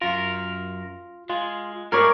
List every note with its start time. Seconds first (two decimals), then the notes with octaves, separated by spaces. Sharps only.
0.01 F#2 F4 A#4
1.29 G#3 F4
1.92 G2 G3 G#3 A#4 C#5 D5 F6 G#6